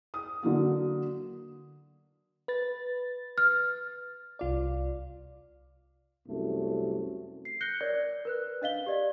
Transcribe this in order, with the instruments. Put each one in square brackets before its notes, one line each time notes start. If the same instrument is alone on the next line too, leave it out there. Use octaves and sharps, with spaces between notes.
[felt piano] D#6
D3 F#3 A#3
[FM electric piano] B4 A6
[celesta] F6
[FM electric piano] C2 F4 D5
[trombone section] C2 F#2 A3
[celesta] C7
F#6 G6 A#6 C#7 G7
A#4 C#5 D5
A#4 B4 F#6
D4 D#5 F5 G7
G4 D5 D#5